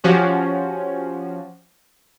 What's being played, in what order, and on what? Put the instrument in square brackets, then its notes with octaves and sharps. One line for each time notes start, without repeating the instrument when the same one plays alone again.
[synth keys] F3 C#4 F#4 G4